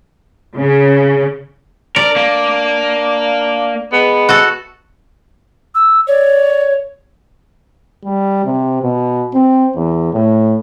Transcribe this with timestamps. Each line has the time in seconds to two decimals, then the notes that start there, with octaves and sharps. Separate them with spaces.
0.56 C#3
1.96 D4 A#4 D5
2.16 A#3
3.92 G#3 B3
4.29 F#4 A4
5.75 E6
6.07 C#5 D5
8.03 G3
8.45 C3
8.82 B2
9.34 C4
9.76 E2
10.13 A2